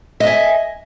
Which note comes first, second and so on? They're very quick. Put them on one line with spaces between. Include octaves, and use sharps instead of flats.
D#5 E5 G#5